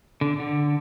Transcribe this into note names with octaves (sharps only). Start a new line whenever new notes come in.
D3
D3